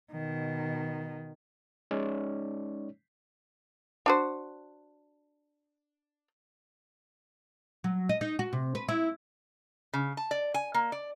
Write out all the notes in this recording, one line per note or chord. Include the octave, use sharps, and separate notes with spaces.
B2 D#3
G#3 C#4 D#4 C#5 D5
D4 F#4 C5
F#3
D#5
D#4
F#4
C3
B4
E4
C#3
A5
D5
G#5
A#3
D5